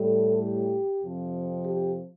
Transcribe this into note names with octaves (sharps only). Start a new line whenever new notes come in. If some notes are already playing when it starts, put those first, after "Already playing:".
Already playing: A2 G3 A4
G4
F2 C3 F3
G4